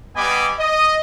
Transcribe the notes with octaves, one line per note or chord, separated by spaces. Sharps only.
G3 B3 D#5 G#5 B5 D6
D#5